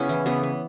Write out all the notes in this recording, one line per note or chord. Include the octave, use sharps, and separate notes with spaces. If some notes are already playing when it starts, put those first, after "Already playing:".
Already playing: C#3 B3 C#4 E4
E3
C#3 B3
B3